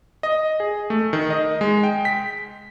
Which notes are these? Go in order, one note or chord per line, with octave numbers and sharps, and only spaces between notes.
D#5
G#4
A3
D#3
D#5
G#3
G5
B6